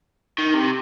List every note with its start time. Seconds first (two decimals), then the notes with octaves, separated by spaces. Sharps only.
0.39 D#3
0.54 C3